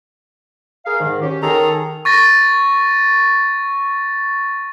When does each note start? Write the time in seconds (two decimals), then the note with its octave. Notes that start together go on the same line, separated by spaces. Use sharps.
0.86 G#4 A#4 F5
1.00 G#2 D#3
1.21 C#4 G4
1.42 D#3 G#4 A4 A#5
2.05 C#6 A6 A#6